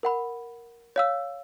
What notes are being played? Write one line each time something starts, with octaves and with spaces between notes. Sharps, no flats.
A#4 F#5 B5
C#5 F5 E6